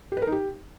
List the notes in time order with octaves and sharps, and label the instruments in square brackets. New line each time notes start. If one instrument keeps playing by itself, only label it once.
[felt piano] G4
B4
A#4
D#4
G4